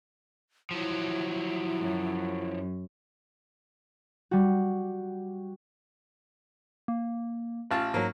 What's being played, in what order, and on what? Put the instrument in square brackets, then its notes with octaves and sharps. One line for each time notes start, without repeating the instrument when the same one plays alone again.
[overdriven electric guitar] F3 F#3 [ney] E4
[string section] F#2
[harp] G3 F#4
[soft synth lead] A#3
[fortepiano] A1 F4 A5
[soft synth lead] G#2 [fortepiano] F#3 A#3